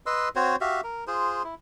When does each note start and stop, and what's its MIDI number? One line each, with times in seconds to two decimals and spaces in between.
0.06 0.29 71
0.06 0.29 75
0.06 0.29 84
0.06 0.29 88
0.36 0.56 60
0.36 0.56 66
0.36 0.56 72
0.36 0.56 73
0.61 0.81 66
0.61 0.81 67
0.61 0.81 76
0.61 0.81 77
0.84 1.04 70
1.07 1.43 65
1.07 1.43 68
1.07 1.43 72
1.44 1.55 64